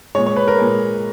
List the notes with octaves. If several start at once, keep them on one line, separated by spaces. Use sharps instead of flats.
A#2 G#3 C#5
C#5
B4
A#4
A#2 G#3